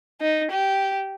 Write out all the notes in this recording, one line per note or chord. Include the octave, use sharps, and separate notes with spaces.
D#4
G4